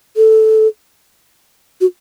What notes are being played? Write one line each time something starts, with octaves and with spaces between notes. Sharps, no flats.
A4
F#4